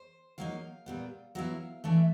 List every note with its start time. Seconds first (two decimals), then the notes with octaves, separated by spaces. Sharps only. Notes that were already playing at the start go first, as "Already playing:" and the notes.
Already playing: C5
0.38 F#3 A#3 D#4 F5
0.86 A#2 G3 B3
1.35 F#3 B3 E4 F5
1.84 E3 A3 D4 E5